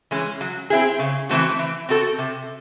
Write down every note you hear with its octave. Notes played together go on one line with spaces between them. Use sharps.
E3 G#3 C#4
F#3
C4 E4 G#4
C#3
E3 A3 C4 F#4
E3
C4 F#4 A4
C3